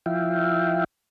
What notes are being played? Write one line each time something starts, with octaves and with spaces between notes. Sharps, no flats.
F3 E4 E5 F5 G5